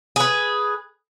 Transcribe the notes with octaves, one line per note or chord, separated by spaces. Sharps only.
G#4 B4